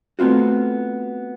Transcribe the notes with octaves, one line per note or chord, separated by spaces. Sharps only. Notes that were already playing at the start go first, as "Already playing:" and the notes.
A3 B3 C4 F4 F#4